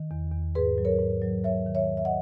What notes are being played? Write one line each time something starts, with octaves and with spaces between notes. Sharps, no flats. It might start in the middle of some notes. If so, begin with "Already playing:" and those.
Already playing: D#3
E2
E2
G#2 G#4 B4
F#3
A#4 C#5
G#2
F#3
F#3 C#5 E5
D#3
C#5 E5
E2
E5
D#5 F#5